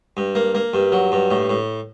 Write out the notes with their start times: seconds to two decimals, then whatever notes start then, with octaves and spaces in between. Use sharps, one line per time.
0.17 G2
0.35 A#3
0.55 A#3
0.74 G2
0.92 F#3
1.12 G2
1.31 A2
1.49 A2